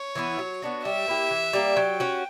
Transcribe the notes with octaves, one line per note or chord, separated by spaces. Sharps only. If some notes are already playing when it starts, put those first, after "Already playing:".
Already playing: C#5
E3 B3 E4
F#3
B3 D4 F#4
G3 E5
A#3 E4 G4
E3
G3 A#3
F#3 G5
C#4 F#4